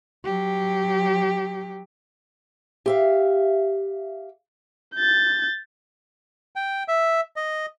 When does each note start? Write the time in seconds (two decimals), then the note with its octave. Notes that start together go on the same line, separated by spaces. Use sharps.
0.25 F#3 G4
2.86 G4 E5 F5
4.96 G6 A6
6.56 G5
6.88 E5
7.36 D#5